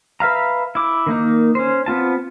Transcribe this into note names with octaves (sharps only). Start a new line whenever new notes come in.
B4 E5 F5 A#5
E4 D6
D#3 A#3 D#4
C#4 C5
B3 C4 F4 A5